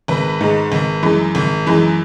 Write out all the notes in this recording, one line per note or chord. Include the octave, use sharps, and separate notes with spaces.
G#1 B4
G#2 D#3 G#3
G#1
F#2 E3 G#3
G#1
F#2 E3 G#3